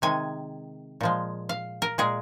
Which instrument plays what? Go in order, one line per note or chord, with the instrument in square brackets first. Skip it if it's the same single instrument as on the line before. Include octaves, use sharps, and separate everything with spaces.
[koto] C3 D#3 G#3 G#5
A#2 F3 G#3
F5
A#4
A#2 G#3 G#4